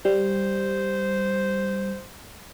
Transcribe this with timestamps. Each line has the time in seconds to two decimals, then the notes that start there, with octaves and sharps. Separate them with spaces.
0.05 G3 C5